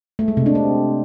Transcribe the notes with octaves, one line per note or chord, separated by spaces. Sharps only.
A3
G#3
C3
D4
C4